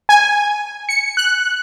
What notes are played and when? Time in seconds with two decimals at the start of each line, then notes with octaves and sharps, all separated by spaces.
0.09 G#5
0.89 C#7
1.17 F#6